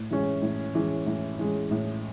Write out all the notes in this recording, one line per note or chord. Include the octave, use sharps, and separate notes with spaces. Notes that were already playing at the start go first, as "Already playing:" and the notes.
Already playing: A2
E3 G#3 C#4
A2
E3 G#3 C#4
A2
E3 G#3 C#4
A2